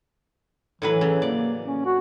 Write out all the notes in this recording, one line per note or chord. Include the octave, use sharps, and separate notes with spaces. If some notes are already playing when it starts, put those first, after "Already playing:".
A2 E3 F#3 B4
C#3
A#3 D5
C#4
F#4